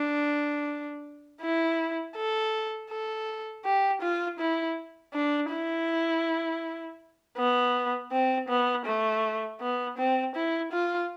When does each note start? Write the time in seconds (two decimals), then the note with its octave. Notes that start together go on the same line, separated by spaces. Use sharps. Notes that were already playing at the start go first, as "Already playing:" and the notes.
Already playing: D4
1.42 E4
2.16 A4
2.91 A4
3.65 G4
4.02 F4
4.40 E4
5.14 D4
5.51 E4
7.37 B3
8.12 C4
8.49 B3
8.86 A3
9.61 B3
9.98 C4
10.35 E4
10.72 F4